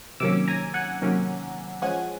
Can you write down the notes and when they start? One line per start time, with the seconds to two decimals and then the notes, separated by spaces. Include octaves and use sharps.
0.20 C3 D#3 F#3 A#3 C#4 D6 E6
0.48 G#5 A#5
0.74 F#5 G#5
1.02 C3 D#3 F#3 A#3 C#4
1.82 F3 G#3 C#4 F#5 G#5